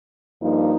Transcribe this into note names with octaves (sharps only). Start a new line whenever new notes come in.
G2 F3 A#3 D#4